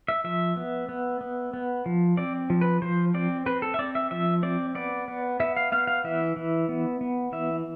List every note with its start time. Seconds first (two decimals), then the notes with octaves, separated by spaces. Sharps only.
0.08 E5
0.24 F3 E5
0.57 B3
0.89 B3
1.21 B3
1.54 B3
1.86 F3
2.17 C4 D5
2.50 F3
2.61 B4
2.82 F3 C5
3.14 C4 D5
3.46 C4 B4
3.62 A4
3.74 E5
3.79 C4 D5
3.95 E5
4.11 F3 E5
4.43 C4 D5
4.75 B3 D5
5.08 B3
5.40 B3 E5
5.57 F5
5.72 B3 F5
5.87 F5
6.04 E3 E5
6.36 E3
6.69 B3
7.01 B3
7.32 E3 E5